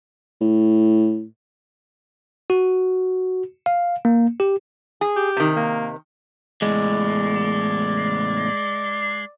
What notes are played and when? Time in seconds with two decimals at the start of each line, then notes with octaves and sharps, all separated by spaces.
0.41 A2
2.50 F#4
3.66 F5
4.05 A#3
4.40 G4
5.01 G#4
5.16 G4
5.37 C3 D#3
5.57 A#3
6.62 E2 A2 G#3 D5